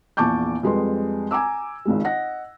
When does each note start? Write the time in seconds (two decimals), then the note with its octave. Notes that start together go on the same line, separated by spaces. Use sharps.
0.17 A#1 E2 A5 C#6 D6 G6
0.63 F2 G3 G#3 C4 B4 C6
1.31 G#5 A#5 D6 E6
1.85 G#1 C#2 G#3
2.04 D#5 F#5 A#6